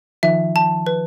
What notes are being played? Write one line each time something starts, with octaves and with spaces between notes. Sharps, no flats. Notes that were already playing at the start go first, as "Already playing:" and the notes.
D#3 F3 E5
A5
B4